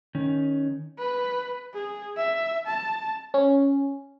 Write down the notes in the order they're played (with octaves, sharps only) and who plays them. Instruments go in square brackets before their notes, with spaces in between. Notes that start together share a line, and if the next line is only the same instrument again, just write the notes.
[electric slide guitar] D#3 C#4
[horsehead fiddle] B4
G#4
E5
A5
[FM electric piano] C#4